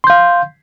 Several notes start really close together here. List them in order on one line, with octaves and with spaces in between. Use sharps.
C6 G6 F5